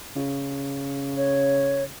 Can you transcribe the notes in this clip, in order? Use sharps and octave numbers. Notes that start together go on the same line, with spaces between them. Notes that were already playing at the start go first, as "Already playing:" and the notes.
C#3
C#5